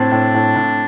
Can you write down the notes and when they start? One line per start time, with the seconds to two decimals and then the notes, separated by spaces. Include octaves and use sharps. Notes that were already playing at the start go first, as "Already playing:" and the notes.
Already playing: A2 C4 D4
0.12 A2
0.34 A2
0.56 A2